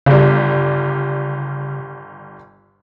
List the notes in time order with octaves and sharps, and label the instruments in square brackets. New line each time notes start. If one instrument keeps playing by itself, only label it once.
[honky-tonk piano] G1 G3 [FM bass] C#3